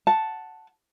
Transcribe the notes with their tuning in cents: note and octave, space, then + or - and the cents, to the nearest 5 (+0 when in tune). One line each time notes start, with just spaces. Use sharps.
F#5 +0 A5 +0